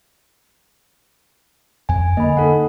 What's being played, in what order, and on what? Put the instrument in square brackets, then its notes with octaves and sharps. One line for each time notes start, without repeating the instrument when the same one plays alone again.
[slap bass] F2 [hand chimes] G#5
[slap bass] D3 A#3 [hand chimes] D#5 B5
[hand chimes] D#4 A4 F#5